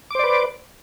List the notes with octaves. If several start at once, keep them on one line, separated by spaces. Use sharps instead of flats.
B4 C5 D5 D6